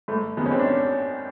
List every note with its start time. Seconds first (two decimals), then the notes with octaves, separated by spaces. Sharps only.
0.08 G1 A3
0.37 F#2 D#3 G#3 B3
0.46 C#4
0.51 C4
0.59 D4
0.65 C#4